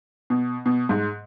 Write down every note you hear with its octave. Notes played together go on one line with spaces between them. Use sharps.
B2
B2
G#2